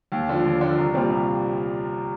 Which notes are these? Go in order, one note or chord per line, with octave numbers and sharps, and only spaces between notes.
D#2
D3 F3
D#2
D3 F3
C2
A#2 G3 C4 F4
C2